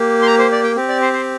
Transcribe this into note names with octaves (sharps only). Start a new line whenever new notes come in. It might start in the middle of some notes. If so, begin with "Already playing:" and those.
Already playing: A#3 G4
C6
A#5
C5
D5
G5
C4 G4
D5
C5
C5